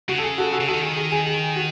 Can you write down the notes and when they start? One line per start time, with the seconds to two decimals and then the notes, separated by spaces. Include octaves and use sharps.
0.08 C#3 F#4
0.18 A4
0.23 G#4
0.38 F#4 A4
0.52 F#4 A4
0.60 C#3
0.68 D#3 F#4 A4
0.82 G#4
0.96 G#4
1.12 G#4
1.26 G#4
1.56 F#4